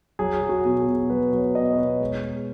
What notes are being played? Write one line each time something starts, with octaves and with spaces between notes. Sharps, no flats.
F#3 G#4
F#3
F#4
B2 F#4
G#4
B2
F#3 B4
F#3 C#5
B2 D#5
B4
B2 C#5
G#3
G#3